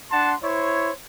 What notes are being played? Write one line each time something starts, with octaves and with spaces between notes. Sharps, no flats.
D4 F#5 A5 C6
E4 C5 C#5